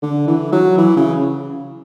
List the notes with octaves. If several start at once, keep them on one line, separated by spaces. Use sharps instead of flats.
D3
E3
F#3
E3
C#3